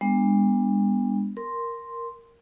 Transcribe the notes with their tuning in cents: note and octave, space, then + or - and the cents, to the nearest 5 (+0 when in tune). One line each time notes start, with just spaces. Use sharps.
G#3 -45 B3 +0 D4 +0
A#4 +0 C6 +0